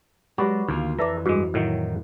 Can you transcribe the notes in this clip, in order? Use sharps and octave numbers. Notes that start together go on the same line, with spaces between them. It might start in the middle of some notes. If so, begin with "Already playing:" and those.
F#3 G#3 F#4 G4 B4 D5
D2 D#3 A#3 F4
F2 E3 A4 B4 D5 E5 A#5 D6
G2 G#3 F#4
A2 D#3 F#3